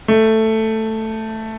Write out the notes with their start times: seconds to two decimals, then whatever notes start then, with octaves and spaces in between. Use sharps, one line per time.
0.08 A3